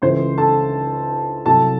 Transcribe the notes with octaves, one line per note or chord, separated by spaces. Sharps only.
C#2 C#3 E3 A3 C5 C6
A4 A5
C2 C3 F#3 A3 A4 A5